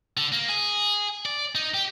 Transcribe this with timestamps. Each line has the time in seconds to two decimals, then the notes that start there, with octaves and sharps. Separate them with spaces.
0.17 D3
0.32 A#3
0.49 G#4
1.26 D5
1.55 D#4
1.74 G4